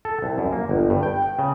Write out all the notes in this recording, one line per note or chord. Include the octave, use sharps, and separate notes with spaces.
A4
C2
F#2
A#3
G1
G2
G5
G5
C#3